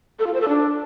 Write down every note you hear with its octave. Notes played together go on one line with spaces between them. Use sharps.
A4
F4
C5
A4
D4